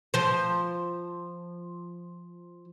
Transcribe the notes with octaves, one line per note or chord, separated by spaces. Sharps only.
F3 C5